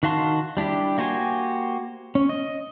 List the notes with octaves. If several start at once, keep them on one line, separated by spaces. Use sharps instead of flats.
D#3 F#4 F5 A5 C6
G3 D4 E4 G4
A#3 F#4 G4 C5 G#5
C#4
D#5